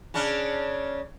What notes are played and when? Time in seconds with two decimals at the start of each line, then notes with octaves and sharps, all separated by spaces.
0.14 C#3 C#4 D4